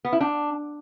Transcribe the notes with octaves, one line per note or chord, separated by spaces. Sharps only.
B3
E4
D4